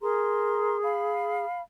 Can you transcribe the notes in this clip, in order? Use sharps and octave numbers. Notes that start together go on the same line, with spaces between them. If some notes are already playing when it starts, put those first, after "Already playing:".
G#4 A#4 A#5 C6
F5 B5